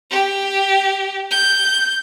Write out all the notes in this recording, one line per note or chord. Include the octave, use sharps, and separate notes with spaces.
G4
G6